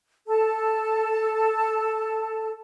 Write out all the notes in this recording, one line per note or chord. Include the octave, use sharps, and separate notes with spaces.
A4 A5